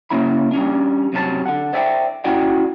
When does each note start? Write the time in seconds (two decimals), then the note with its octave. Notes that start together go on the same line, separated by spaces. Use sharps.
0.10 C#3 A#3 C#4 E4 B5
0.51 G3 C#4 D4
1.13 F#2 C3 C#4 F#4 A5
1.46 D3 F#5
1.73 C5 D5 E5 G5
2.24 C#4 E4 F#4 D5 F#5 G5